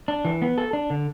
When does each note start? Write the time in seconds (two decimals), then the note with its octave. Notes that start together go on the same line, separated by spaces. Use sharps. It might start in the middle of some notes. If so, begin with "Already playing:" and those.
0.08 D4
0.25 E3
0.42 B3
0.58 A4
0.73 D4
0.90 D3